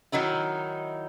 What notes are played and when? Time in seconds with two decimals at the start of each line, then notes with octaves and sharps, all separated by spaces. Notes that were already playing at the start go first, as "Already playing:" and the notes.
0.12 D#3 F#3 D#4 E4